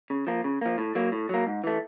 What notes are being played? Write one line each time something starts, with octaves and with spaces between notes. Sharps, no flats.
C#3
F3 A#3
C#3
F3 A#3
A2
F#3 A#3
A2
F#3 A#3
G#2
E3 A3